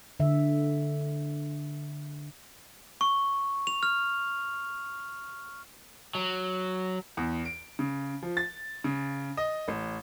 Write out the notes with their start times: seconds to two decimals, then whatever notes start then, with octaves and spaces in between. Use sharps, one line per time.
0.20 D3 E5
3.01 C#6
3.67 F7
3.83 F6
6.15 F#3
7.17 E2
7.45 D7
7.79 C#3
8.23 F3
8.37 A6
8.84 C#3
9.37 D#5
9.68 A1